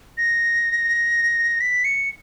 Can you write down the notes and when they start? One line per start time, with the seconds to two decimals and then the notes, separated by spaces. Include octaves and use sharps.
0.18 A#6
1.61 B6
1.85 C#7